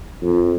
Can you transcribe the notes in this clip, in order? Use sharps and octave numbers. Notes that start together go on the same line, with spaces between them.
F2